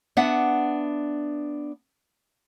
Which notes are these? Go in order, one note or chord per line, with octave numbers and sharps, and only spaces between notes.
B3 D4 E5 F#5